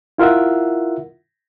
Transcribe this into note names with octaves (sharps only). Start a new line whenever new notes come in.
E4 F4 A#4 E5 F#5